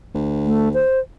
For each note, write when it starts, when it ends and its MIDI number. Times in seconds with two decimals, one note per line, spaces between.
0.14 0.83 38
0.45 0.69 57
0.74 1.00 72